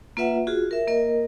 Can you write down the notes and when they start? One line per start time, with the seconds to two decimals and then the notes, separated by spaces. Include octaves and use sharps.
0.17 A#3 F4 B4 E5 F#5
0.47 F4 F#4 G#4
0.71 A#4 E5
0.87 A#3 A#4 D#5